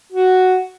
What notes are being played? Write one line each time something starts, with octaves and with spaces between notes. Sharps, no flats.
F#4